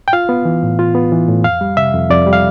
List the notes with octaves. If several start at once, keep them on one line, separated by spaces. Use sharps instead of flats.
G5
F4 F5
B3
E3
A2
F4
B3
E3
A2
F2 F5
G3
C3 E5
F2
F2 D5
G3
F5